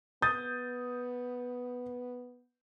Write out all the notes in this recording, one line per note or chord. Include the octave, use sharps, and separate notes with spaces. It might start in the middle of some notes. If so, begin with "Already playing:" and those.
B3 D#6 G6 A6